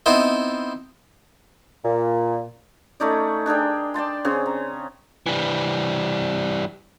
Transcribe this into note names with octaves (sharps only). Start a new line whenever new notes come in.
B3 C4 D#4 E4 C5
A#2
A3 C#4 D#4 D5
D4 G#4 A#4 G5
D5 G5 A5 C6
C#3 C4 C#4 G#4
A#5
E3 G3